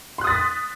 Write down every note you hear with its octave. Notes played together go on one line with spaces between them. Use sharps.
C6 D#6 F#6 A6 B6